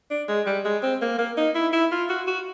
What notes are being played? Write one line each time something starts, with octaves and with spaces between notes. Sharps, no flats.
D4
G#3
G3
G#3
C4
A#3
A#3
D#4
E4
E4
F4
F#4
F#4